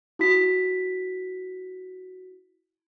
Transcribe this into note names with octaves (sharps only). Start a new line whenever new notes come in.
E4 F#4 B6